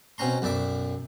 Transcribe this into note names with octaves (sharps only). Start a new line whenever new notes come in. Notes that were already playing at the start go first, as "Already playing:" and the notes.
B2 C4 C#4 A#5 C6
B1 F#2 D5 E5 D6